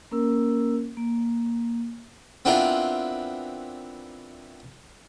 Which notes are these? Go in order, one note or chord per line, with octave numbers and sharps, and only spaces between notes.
A#3 C#4 A#4 E6
A#3
B3 C4 D4 E4 F4 A#4